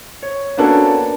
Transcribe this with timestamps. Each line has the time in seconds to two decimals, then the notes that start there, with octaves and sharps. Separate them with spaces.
0.22 C#5
0.57 A#3 B3 C#4 D4 F#4 A4